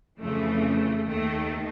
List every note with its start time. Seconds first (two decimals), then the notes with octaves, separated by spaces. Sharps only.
0.20 F2 C#3 E3 A3
1.07 D#2 D#3 A3